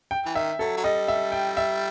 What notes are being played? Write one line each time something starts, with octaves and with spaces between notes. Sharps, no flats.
G5
E3
D#3 E5
F#3 A4
F#3
G3 D#5
E5
G5
E5